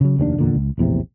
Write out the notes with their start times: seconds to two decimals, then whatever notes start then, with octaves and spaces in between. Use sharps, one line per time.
0.01 C#3 F#3
0.19 F1 D#2 C4 D4
0.38 E2 A#2 D3
0.55 C#2
0.78 A#1 E2 A2 C3